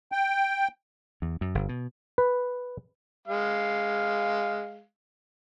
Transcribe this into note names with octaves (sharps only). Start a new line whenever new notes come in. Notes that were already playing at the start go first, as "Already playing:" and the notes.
G5
E2
F#2
G1
B2
B4
G#3 F5